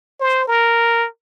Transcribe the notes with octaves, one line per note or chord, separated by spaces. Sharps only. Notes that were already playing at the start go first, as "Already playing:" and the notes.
C5
A#4